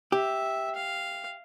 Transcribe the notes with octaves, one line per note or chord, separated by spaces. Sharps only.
G4 E5
F5